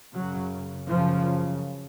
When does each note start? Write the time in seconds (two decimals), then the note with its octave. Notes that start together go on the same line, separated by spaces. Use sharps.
0.15 F#2 C#3 F#3
0.90 F#2 C#3 F3